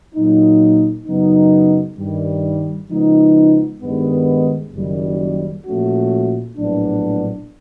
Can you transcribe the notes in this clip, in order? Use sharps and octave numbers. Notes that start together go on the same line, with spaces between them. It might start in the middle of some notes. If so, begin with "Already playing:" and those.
A#2 F#3 A#3 D#4
F#2 C#3 F#3 B3 D#4
G2 D#3 G3
C#3 F3 G#3 B3 D#4
G2 D#3 G#3 B3
F#1 F#2 D#3 G3
A#2 F3 A3 C#4 F#4
A#1 A2 F#3 B3 D4